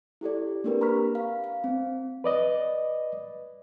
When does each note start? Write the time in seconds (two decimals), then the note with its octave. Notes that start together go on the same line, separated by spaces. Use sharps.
0.21 E4 G4 A4 D5
0.64 A#3 C4 D4 G4 A#4 B4
0.81 A#5 B5 C#6 F6 B6
1.15 F5
1.44 F5
1.64 C4
2.24 B4 D5 D#5